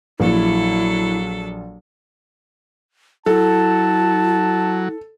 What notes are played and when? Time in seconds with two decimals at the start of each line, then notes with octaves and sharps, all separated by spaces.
0.20 A#1 F#3 E4 A4
3.26 F#3 E4 A4 A5